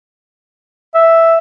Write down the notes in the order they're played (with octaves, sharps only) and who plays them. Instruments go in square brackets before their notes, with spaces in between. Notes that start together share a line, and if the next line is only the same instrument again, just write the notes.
[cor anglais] E5